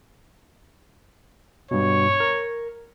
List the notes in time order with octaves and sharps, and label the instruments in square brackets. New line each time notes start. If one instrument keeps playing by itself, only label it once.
[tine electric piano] G2 B2 [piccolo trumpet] C#5
[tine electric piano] A#4